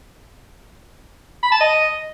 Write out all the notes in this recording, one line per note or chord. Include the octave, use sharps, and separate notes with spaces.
B5
A5
D#5